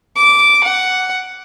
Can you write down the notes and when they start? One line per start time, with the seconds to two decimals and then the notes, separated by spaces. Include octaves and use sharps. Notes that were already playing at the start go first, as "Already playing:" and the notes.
0.16 D6
0.64 F#5